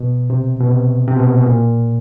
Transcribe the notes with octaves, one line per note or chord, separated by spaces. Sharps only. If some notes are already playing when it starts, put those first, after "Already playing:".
Already playing: B2
C3
B2
C3
C3
B2
A#2
B2
A#2